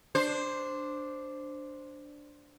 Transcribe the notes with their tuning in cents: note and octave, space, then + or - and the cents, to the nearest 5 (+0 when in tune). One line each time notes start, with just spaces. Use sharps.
D4 +0 C5 +0